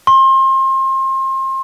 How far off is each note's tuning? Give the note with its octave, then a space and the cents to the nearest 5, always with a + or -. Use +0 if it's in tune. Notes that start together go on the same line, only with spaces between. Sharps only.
C6 +30